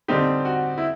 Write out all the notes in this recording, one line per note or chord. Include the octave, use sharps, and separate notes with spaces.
D3 G3 C4 D#4 G4
F#4
E4